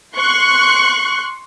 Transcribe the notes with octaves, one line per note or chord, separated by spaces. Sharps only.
C6 C#6 F#6